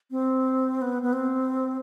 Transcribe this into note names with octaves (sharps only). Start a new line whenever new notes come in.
C4
B3
B3
C4